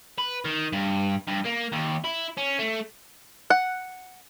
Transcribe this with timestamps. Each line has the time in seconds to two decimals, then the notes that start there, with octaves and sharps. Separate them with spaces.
0.18 B4
0.45 D#3
0.73 G2
1.27 G2
1.45 A#3
1.72 D#2
2.04 E4
2.37 C#4
2.59 A3
3.50 F#5